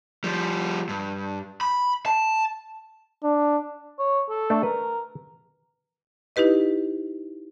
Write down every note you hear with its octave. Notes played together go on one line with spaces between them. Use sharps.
F3 G3
G2
B5
A5
D4
C#5
A4
A3 D4
A#4 B4
D#4 E4 G4 B4 D#5